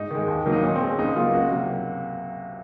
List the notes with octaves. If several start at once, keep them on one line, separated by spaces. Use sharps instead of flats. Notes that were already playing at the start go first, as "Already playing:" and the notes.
Already playing: G#2 D#4
D#3 G#3
D#2
D#3 F#3 A#3
D#4
A#2 C#4
C4
G#3
C#4
C#2 D#4
C#3 F#3 A#3 F4
C#2 F#4
C3 F#3 A#3